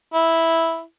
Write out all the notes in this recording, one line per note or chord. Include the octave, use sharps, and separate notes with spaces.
E4